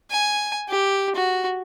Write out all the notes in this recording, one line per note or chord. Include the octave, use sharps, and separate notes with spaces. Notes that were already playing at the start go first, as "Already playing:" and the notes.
G#5
G4
F#4